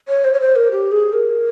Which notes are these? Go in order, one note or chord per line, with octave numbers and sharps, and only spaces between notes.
C#5
C5
C#5
C5
A#4
G4
G#4
A#4